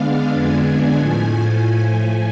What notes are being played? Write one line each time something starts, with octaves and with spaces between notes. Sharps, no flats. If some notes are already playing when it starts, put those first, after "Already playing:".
Already playing: D3 G#3 B3 D4 F5
F2 D3 G#3 B3 D4 G#5
A2 F3 A3